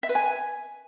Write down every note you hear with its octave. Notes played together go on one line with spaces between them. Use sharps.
E5
B4
G#5